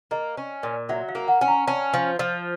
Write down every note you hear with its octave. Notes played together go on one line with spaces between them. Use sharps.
A#3 D#5
C#4
A#2
F#3 E5
F5
A#3
F#5
C#4
A#5
C#4 A5
F3
F3